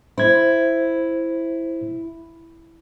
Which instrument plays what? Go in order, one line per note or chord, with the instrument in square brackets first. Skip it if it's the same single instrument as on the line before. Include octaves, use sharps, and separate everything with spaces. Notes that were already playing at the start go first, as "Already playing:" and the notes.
[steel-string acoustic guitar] E4 [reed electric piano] C5 G#6